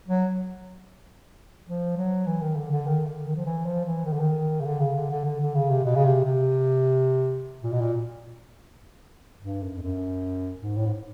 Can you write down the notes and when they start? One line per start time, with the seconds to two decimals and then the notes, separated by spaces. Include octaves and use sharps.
0.08 F#3
1.67 F3
1.97 F#3
2.26 E3
2.41 D#3
2.56 D3
2.71 D3
2.87 D#3
3.06 D3
3.26 D#3
3.36 F3
3.45 E3
3.66 F3
3.85 E3
4.06 D#3
4.13 D3
4.20 D#3
4.61 C#3
4.65 D3
4.80 C#3
4.95 D3
5.10 D3
5.25 D3
5.40 D3
5.55 C#3
5.70 C3
5.85 B2
5.95 C#3
6.05 C3
6.24 C3
7.63 A#2
7.73 B2
7.81 A#2
9.42 G2
9.63 F#2
9.77 F2
9.82 F#2
10.62 G#2
10.77 A2
10.87 G#2